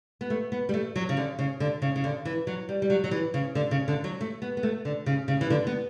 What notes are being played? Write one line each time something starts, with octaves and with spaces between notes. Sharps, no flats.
B3
A3
B3
G3
A3
F#3
C#3
D3
C#3
D3
C#3
C#3
D3
E3
F#3
G3
G3
F#3
F#3
E3
C#3
D3
C#3
D3
F#3
A3
B3
B3
A3
D3
C#3
C#3
E3
D3
B3